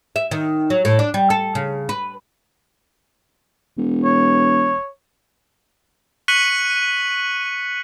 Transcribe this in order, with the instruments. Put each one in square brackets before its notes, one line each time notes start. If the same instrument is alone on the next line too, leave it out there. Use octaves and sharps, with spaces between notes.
[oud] E5
D#3
F#3
A2
D4
G3
A4
C#3
B4
[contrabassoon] E1
[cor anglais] C#5
[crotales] C#6 F#6 B6 C#7 D#7 F#7